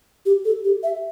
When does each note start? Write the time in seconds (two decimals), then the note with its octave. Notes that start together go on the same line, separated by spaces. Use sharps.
0.26 G4
0.45 A4
0.64 G4
0.83 E5